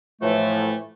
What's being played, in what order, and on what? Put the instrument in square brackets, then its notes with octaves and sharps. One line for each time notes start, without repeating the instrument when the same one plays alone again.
[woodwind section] A2 E3 F3 A3